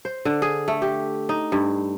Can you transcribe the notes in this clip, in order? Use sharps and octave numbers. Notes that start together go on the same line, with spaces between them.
C5
D3
G#4
A3
G4
D#4
G2